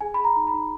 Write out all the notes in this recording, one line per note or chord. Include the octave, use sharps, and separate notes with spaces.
G#4 G#5
G#4 B5
A#5
D#4
B5
D#4